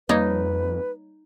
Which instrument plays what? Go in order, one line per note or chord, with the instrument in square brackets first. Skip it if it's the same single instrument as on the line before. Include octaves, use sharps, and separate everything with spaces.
[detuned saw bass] F2 [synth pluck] G3 A#3 C#5 [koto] D#4 [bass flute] B4